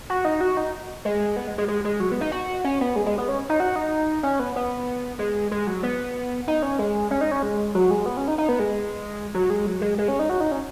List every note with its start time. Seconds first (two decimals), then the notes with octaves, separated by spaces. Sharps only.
0.10 F#4
0.25 D#4
0.41 F#4
0.57 D#4
1.05 G#3
1.36 B3
1.47 G#3
1.58 G#3
1.68 G#3
1.85 G#3
2.00 F#3
2.12 B3
2.21 D#4
2.32 F#4
2.64 C#4
2.81 B3
2.96 G#3
3.06 G#3
3.18 B3
3.29 C#4
3.49 D#4
3.60 F#4
3.76 D#4
4.23 C#4
4.40 B3
4.56 B3
5.19 G#3
5.51 G#3
5.67 F#3
5.83 B3
6.48 D#4
6.63 C#4
6.79 G#3
7.11 C#4
7.21 D#4
7.31 C#4
7.43 G#3
7.75 F#3
7.91 G#3
8.06 B3
8.17 C#4
8.28 D#4
8.38 D#4
8.49 B3
8.60 G#3
9.34 F#3
9.50 G#3
9.66 F#3
9.81 G#3
9.98 G#3
10.08 C#4
10.19 D#4
10.30 F#4
10.40 D#4
10.52 C#4